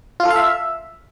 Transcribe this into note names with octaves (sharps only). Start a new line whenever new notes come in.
F4
A4
F5
E5